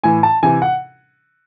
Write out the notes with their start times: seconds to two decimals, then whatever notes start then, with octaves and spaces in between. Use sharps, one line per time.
0.04 A2 E3 G#5
0.23 A5
0.43 C3 E3 G#5
0.62 F#5